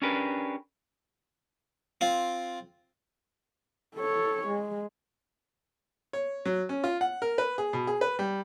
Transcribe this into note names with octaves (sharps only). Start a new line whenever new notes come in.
C#4 D4 G4 G#4 A#4 B4
C4 F4
A4 C#5
G#3
C#5
F#3
C#4
F4
F#5
A#4
B4
G#4
B2
G#4
B4
G3